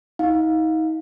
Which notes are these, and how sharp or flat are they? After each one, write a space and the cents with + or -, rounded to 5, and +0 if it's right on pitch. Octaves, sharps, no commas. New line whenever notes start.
D#4 +35 F5 +20